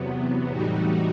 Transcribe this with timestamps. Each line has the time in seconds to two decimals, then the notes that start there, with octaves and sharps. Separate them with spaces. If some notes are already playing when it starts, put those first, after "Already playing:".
Already playing: E2 C3 F#3 B3
0.50 A2 E3 G3 D#4 F#4